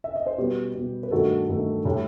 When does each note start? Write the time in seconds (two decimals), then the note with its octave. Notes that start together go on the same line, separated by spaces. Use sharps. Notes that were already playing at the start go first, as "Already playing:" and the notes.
0.04 E5
0.16 D#5
0.26 C5
0.38 B2 G3 G4 B4
0.75 B2
0.80 G3
1.03 B4
1.11 G2 D#3 A3 F#4 A4
1.48 G2 D#3 A3
1.85 A2 G3